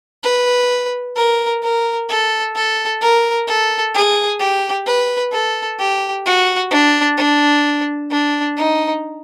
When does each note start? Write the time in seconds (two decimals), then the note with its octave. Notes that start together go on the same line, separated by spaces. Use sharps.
0.24 B4
1.16 A#4
1.63 A#4
2.09 A4
2.55 A4
3.02 A#4
3.48 A4
3.94 G#4
4.40 G4
4.87 B4
5.32 A4
5.79 G4
6.26 F#4
6.71 D4
7.18 D4
8.11 D4
8.57 D#4